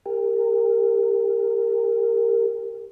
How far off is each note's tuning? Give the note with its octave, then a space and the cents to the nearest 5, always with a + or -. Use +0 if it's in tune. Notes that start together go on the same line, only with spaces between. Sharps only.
G4 +25 A#4 -15